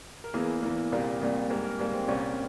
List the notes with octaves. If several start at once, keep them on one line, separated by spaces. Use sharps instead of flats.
A#4
E2 E3 A#3 G#4
E2 E3 A#3
C2 A#2 G3 A#3
C2 A#2 G3 A#3
G#2 G3 A#3 A#4
A#4
G#2 G3 A#3 G4
C4
C2 A#2 G3 A#3 C#4